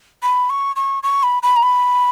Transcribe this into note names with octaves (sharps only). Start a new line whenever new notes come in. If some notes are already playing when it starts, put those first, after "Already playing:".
B5
C#6
C#6
C#6
B5
B5
A#5
B5